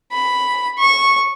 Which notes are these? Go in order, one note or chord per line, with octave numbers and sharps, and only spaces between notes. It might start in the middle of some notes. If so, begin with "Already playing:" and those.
B5
C#6